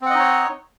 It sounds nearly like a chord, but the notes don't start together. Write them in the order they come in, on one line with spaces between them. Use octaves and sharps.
C4 F#5 D#5 D#4 C#5